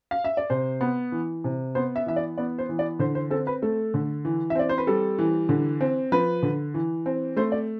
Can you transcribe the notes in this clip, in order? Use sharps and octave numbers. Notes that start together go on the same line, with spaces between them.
F5
E5
D5
C3 C5
B3
E3
C3
B3 C5
E5
E3 E5
D5
B3 D5
C5
E3
D5
D3 C5
C5
C4 A4
B4
A3 A4
D3
E3
E5
C4 D5
C5
B4
G3 A4
E3
D3
C4
F3 B4
D3
E3
C4
A3 C5
D5